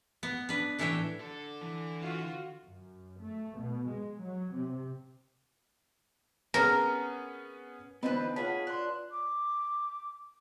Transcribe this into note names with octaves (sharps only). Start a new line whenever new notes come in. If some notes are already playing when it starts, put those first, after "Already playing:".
B3
D4 B4
A2 E3 D4 C#5 E5 G5
D3 A4
E3
F4 F#4
F#2
A3
B2
G#3
F#3
C3
B3 C#4 G#4 A#4
D3 E3 B3 C4 D#4 F4 B4 B5
F4 G#4 B4 C#5 F#5 A5 B6
D4 C6 F#6
D6